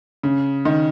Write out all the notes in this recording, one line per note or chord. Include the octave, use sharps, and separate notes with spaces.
C#3
D#3